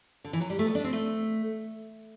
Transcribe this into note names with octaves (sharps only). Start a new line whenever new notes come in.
D3
E3
F#3
G3
A3
B3
D4
C4
A3